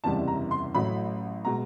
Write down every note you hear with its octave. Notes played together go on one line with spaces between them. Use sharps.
F#1 E2 C3 E3 G3 A5
A#5
C6
A1 A2 F#3 B5
B2 G#3 A#5